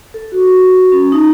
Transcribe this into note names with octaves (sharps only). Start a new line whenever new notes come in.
A4
F#4
C#4
D#4